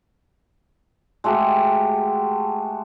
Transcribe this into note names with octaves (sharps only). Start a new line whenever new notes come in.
G#3 A3 F#4 G4